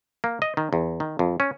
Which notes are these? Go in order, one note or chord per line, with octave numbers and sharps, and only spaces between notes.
A#3
D#5
D#3
E2
D#3
F2
C#4